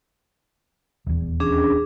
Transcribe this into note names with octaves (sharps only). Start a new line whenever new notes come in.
D#1 E2
C#4 D4 G#4